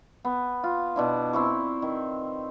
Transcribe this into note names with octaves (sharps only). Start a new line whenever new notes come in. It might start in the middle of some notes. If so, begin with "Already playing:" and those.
B3
F4
B2 D4 E4
C4 E4 C#6
D#3